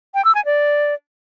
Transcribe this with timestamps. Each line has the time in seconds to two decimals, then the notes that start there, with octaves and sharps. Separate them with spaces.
0.14 G5
0.25 E6
0.35 G#5
0.45 D5